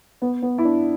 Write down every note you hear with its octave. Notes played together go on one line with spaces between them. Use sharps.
B3
B3
E4
D4